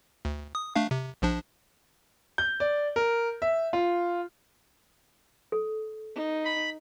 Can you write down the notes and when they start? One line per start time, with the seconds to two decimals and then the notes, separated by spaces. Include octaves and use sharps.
0.25 D2
0.55 D#6
0.76 A3 D4 F5
0.91 C3
1.22 A#1 F3 D4
2.38 G6
2.60 D5
2.96 A#4
3.42 E5
3.73 F4
5.52 A4
6.16 D#4
6.45 B5